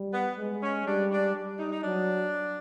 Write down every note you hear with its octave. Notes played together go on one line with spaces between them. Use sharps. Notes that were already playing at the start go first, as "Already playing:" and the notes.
Already playing: G3
B3
G#3
C#4
G3 D4
D4
G3
D#4
D#4
F#3 D4